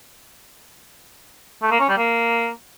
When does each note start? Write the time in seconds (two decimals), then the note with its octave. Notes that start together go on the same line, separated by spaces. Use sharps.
1.62 A3
1.71 A#3
1.80 C#4
1.89 G3
1.97 A#3